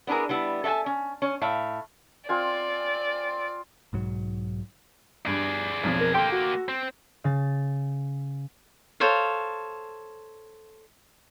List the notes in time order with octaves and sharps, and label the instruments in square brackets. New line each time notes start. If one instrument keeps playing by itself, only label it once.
[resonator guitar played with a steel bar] B3 D4 E4 G#4 A#4
G3 B3 E4
A4 E5 F#5 G#5 A5
C#4
C#4
A2 E5 F5
[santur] C4 F4 G#5 [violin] D5
[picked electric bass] B1 G#2 F#3
[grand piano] G2 [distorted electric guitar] G#4 D5
[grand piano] B1 F2 F3
[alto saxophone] A#4
[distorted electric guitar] A#3 G4 [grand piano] A4 C6 [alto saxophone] G5
[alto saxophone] F#4
[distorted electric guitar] C4
[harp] C#3 A6
[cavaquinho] A4 C5 C#5 F5